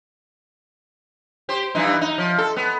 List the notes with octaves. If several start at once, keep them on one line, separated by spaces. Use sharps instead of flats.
G4 C5
G2 E3 D#4
D#4
F3
A4
B3